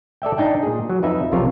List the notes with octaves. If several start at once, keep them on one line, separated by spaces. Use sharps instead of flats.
A4 D5 E5 G5
D4 D#4 G5 G#5
A#2 G#4
F#3
F2 D#4 B4 E5
B1 F2 C3 F4 A#4 C#5